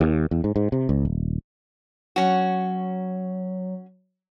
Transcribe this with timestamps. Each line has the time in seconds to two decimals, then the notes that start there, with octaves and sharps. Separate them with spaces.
0.01 D#2
0.31 E2
0.44 G#2
0.56 G#2
0.72 C3
0.89 C#2
1.05 D#1
2.16 F#3 C#4 F#4